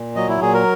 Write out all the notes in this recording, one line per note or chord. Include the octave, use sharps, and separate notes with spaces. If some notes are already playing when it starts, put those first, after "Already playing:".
Already playing: A#2
F#3 D#5
E4
A#2 G#4
A#4